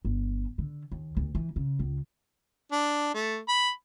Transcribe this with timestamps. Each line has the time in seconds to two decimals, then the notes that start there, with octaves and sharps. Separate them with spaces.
0.05 G1
0.58 D3
0.92 D#2
1.17 D2
1.35 E3
1.56 C#3
1.79 C#2
2.72 D4
3.14 A3
3.48 B5